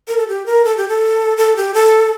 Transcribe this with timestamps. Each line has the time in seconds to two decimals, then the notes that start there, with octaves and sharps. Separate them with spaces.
0.08 A#4
0.17 A4
0.28 G4
0.46 A#4
0.65 A4
0.77 G4
0.89 A4
1.37 A4
1.56 G4
1.74 A4